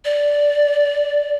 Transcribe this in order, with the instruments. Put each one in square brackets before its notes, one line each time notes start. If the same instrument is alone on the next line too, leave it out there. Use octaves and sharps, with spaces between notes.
[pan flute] D5